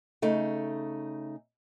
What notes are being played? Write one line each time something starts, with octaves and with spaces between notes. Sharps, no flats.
C#3 A3 D#4